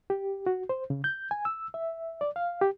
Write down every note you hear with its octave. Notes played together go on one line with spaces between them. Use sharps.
G4
F#4
C5
C#3
G6
G#5
E6
E5
D5
F5
G4